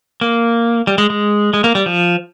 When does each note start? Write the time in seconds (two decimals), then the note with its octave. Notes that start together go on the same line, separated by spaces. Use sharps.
0.21 A#3
0.87 G3
0.98 G#3
1.10 G#3
1.54 G#3
1.64 A#3
1.75 G3
1.86 F3